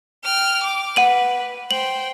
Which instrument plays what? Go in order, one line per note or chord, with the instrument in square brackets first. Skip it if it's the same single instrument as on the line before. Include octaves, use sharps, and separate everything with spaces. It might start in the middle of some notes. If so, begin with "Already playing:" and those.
[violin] G5 F6
D6
[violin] B4 [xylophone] F#5 D#7 F#7
[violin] C5 G5 [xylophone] F#7